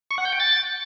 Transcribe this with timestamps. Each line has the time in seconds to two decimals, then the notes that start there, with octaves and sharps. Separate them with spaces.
0.11 C#6
0.18 F#5
0.25 G6
0.33 G5
0.40 A6